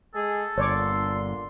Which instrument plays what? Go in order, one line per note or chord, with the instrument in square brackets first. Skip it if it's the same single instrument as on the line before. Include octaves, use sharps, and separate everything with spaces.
[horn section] G#3 G#4 [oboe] A4
[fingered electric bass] G1 [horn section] A#2 D3 C6 [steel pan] C#5 D5 D6